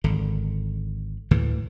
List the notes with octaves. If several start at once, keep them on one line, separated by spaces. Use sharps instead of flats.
G#1 D3
D2 A2 D3 E3